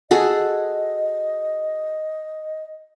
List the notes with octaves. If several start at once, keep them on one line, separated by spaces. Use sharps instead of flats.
F#4 G#4 A4 D#5